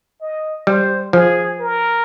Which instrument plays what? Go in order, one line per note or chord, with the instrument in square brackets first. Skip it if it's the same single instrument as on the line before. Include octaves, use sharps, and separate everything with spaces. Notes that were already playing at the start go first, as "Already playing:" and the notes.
[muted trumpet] D#5
[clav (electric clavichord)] G3 [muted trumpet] C5
[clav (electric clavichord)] F3 [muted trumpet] G#4
[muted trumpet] A#4